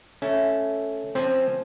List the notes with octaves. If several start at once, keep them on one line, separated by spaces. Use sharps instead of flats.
A3 C#4
F3 C4 C#4 C5